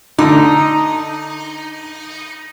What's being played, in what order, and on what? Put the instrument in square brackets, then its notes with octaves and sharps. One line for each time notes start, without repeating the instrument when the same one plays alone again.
[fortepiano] D3 [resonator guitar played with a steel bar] D#4